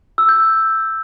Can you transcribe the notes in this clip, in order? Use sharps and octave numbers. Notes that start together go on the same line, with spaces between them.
E6
G6